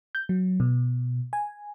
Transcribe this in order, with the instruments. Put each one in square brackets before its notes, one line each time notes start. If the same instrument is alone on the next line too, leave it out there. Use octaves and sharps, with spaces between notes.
[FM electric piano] G6
F#3
B2
G#5